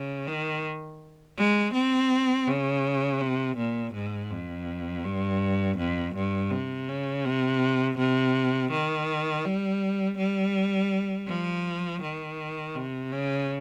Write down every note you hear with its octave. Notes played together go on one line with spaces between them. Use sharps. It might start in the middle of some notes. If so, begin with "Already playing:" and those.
Already playing: C#3
D#3
G#3
C4
C#3
C3
A#2
G#2
F2
G2
F2
G2
C3
C#3
C3
C3
D#3
G3
G3
F3
D#3
C3
C#3